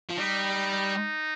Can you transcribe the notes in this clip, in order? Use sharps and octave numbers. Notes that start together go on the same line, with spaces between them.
F3
G3 D#4
D#4